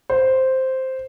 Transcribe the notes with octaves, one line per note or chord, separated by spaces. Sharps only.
C5